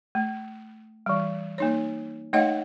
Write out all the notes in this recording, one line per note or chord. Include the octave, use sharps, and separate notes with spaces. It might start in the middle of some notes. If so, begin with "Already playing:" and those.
A3
E3 G3
A#3 D#4 C#5
A3 D#4 C#5 D#5 F5 F#5